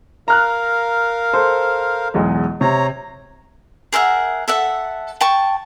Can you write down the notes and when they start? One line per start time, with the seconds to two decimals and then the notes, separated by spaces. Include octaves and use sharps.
0.28 A#4 F5 A#5 F6 F#6
1.33 A4 C5 C6
2.14 B1 E2 G#3
2.61 C3 C#5 A#5
3.92 G#4 A#4 E5 F#5
4.48 A4 E5 F#5
5.21 G5 A5 C#6